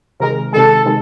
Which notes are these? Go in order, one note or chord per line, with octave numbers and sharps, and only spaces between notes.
C3 D#3 G#3 A#4
C3 D#3 G#3 A4
C3 D#3 G#3